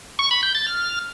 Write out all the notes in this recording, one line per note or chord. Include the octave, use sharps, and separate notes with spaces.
C#6
B5
G6
A6
F6